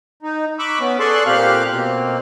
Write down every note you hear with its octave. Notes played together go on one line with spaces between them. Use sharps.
D#4
B5 C#6 D6 E6 F#6
B3 C#4
G#4 A4 D5 C6 C#6 F#6
A#2 C4 G4 F5 F6 F#6
B2 A#3 C4